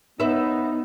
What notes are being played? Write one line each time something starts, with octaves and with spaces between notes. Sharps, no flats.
B3 D#4 B4 E5